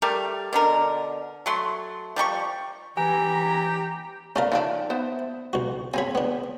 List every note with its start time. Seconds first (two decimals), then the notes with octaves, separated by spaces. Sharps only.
0.02 G3 A3 A#4
0.53 B2 D3 A#4
1.46 F#3 A3 C6
2.16 F3 G3 D#4 C#6
2.97 E3 G4 G#5 A#5
4.36 A3 C#4 A#4 D5 F5
4.52 D#3 F3 D4
4.90 B3 C5 E5
5.53 B1 F#4
5.94 C4 G#4 C#5 G#5 B5
6.15 B3 D4